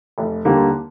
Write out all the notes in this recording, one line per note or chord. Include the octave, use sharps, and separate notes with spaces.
F1
D#2 D3 G3 A#3